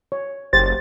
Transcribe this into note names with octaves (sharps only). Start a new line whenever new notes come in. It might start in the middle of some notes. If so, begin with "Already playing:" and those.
C#5
F#1 G4 C5 A6